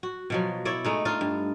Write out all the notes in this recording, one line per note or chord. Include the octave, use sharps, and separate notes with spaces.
F#4
B2 F3 F#3
E4 C#5 D5
G#3 A3 D#4
D4 D#4 F4
G2